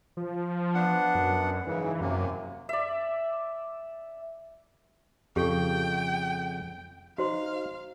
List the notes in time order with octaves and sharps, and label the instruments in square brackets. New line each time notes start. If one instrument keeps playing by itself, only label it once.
[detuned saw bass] F3
[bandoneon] B3 D4 F#5
[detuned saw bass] F#2
[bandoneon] G#2 C#3 [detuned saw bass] E3
[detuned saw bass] F#2 [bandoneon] C3 A#3
[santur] D5 E5
[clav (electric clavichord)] F2 C#3 [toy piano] G4 A4 C#6 [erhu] G5
[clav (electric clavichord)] D#4 [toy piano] F#4 C5 C6 [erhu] F5